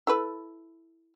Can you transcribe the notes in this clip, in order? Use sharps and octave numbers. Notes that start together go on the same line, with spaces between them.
E4 A4 B4